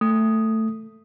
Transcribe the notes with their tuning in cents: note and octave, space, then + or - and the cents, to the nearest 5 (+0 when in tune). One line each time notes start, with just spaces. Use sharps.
A3 +10 D#6 +0